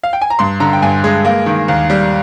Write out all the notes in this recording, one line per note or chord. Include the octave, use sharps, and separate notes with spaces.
F5
G5
G#5
A#5
G2 C6
D3 A#5
G5
G2 G#5
G#3
A#3
D#3
D#2
G3